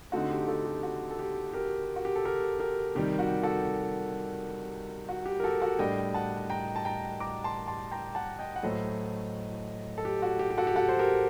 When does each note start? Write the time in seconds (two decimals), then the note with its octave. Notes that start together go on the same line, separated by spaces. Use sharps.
0.12 D3 A3 C4 D#4 F#4
0.30 G4
0.48 F#4 A4
0.65 G4
0.83 F#4
1.11 A4
1.19 G4
1.53 G4 A#4
1.96 F#4
2.05 G4
2.16 A4
2.25 G4 A#4
2.60 G4 A#4
2.95 C3 D#3 G3 G4
3.19 F#4
3.43 F#4 A4
5.09 F#4
5.26 G4
5.40 A#4
5.43 F#4 A4
5.61 F#4 A4
5.79 A2 G3 D4 D#5 G5
6.14 F#5 A5
6.50 G5 A#5
6.76 A5
6.85 G5 A#5
7.20 A#5 D6
7.44 A5 C6
7.68 A5 C6
7.91 G5 A#5
8.15 F#5 A5
8.39 D#5 G5
8.56 F#5
8.63 A2 F#3 A3 C5 D#5
9.98 A4
10.05 G4
10.22 F#4
10.39 G4
10.50 G4
10.58 F#4 A4
10.67 G4
10.76 F#4 A4
10.89 C5
10.99 G4 A#4